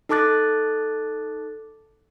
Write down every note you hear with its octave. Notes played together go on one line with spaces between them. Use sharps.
D#4 A4 A5 D6 F#6 A6